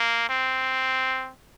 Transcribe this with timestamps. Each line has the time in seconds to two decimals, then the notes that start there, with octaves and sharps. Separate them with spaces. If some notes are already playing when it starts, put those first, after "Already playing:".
Already playing: A#3
0.29 C4